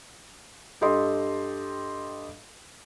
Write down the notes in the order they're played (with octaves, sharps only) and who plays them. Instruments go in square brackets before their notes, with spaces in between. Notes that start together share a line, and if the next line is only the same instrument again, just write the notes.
[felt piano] G2 G4 A4 D#5 C6